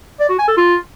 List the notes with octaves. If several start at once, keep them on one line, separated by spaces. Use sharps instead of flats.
D5
F#4
G#5
A4
F4